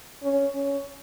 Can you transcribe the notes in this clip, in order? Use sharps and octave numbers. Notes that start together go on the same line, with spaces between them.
C#4
C#4